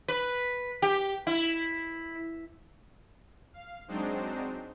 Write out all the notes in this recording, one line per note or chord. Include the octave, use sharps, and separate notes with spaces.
B4
G4
E4
F5
F#3 G#3 C4 D4 D#4 C5